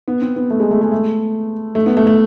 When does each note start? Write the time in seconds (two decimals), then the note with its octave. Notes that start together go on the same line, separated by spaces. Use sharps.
0.08 B3
0.21 C4
0.36 B3
0.50 A3
0.60 G#3
0.71 A3
0.81 G#3
0.92 A3
1.75 A3
1.86 B3
1.97 A3
2.07 A3